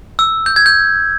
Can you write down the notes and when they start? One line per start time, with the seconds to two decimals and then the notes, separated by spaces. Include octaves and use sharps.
0.19 E6
0.46 G6
0.56 G#6
0.66 G6